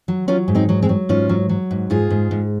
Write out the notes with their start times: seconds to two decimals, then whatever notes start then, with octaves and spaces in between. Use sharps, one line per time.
0.08 F#3
0.28 F#3 C#4 F4
0.48 G#2
0.55 C4 D#4
0.69 F#3
0.82 G#3 C4
0.89 F#3
1.09 G#2 C#4 F4
1.29 F#3
1.49 F#3
1.71 G#2
1.90 G#2 F4 G#4
2.10 G#2
2.31 G#2